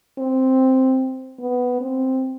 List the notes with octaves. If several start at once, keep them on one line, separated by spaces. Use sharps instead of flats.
C4
B3
C4